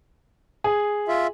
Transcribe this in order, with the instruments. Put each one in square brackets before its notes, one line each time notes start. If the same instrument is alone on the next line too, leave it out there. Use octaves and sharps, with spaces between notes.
[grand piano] G#4
[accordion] F4 E5